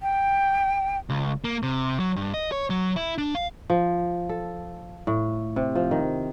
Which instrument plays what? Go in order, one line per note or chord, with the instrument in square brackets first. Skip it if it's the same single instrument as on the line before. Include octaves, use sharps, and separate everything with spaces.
[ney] G5
[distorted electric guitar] C#2
A#3
C3
F#3
G2
D#5
C#5
F#3
E4
D4
F5
[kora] F3
A4
A2
C3
F3
D#3